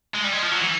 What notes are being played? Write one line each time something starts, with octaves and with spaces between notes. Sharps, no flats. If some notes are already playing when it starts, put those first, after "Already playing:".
G#3
G3
G#3
F3
F#3
E3